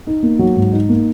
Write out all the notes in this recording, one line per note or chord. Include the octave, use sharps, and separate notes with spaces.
D#4
A#3
F#3
G#2
D#4
A#3